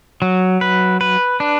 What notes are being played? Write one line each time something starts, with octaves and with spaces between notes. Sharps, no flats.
F#3
B4
B4
D4